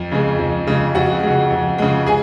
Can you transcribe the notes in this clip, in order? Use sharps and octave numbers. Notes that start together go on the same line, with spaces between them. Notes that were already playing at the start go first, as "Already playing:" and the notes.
Already playing: F2
C#3 G#3
F2
C#3 G#3
F2 F#4 F#5
C#3 G#3
F2
C#3 G#3
G#4 G#5